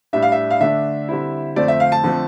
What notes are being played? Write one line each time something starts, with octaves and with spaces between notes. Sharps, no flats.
A2 G3 D4 E5
F5
E5
F5
D3 A3 D4 E5
D3 G3 C4 E4
F2 D3 A3 C4 D5
E5
F5
A5
D3 F3 A3 C4